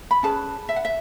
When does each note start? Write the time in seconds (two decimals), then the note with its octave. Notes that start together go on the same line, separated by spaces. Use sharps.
0.11 B5
0.23 C#4 G#4 B4 A5
0.69 E5
0.76 F#5
0.85 E5